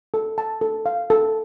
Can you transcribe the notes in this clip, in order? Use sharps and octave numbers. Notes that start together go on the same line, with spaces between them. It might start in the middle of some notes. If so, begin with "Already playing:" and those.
A4
A5
A4
F5
A4